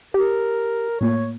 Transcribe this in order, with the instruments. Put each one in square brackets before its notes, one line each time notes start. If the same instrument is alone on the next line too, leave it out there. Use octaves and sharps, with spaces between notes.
[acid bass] G4 [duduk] A#4
[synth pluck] A2 A#3 F4 [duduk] C#5